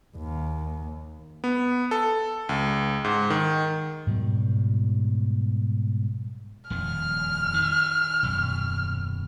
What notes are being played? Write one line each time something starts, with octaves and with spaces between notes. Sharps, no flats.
D#2
B3
A4
C#2
G#2
D#3
G#2 B2 F#3 G3
D#1 F2 D#3 F6
D#3
D#1 F#2 B2